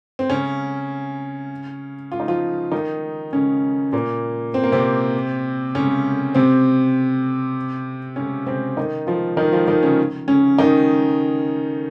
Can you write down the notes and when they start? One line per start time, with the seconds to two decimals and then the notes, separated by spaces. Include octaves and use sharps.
0.19 C4
0.30 C#3 C#4
2.12 F4
2.20 D#4
2.28 F3 F4
2.72 D#3 D#4
3.33 C#3 C#4
3.93 A#2 A#3
4.54 C4
4.64 A#3
4.72 C3 C4
5.75 C#3 C#4
6.35 C3 C4
8.16 C#3 C#4
8.46 C3 C4
8.77 D#3 D#4
9.07 F3 F4
9.37 D#3 D#4
9.52 F3 F4
9.68 D#3 D#4
9.83 C#3 C#4
10.28 C#3 C#4
10.58 D#3 D#4